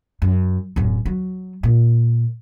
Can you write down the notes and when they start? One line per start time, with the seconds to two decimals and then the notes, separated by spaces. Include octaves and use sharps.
0.22 F#2
0.76 D1 F#2
1.05 F#3
1.63 A#2